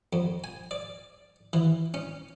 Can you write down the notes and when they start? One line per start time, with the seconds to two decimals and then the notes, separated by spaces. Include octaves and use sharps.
0.13 F2
0.44 G#5
0.71 D5
1.53 E3
1.94 C#4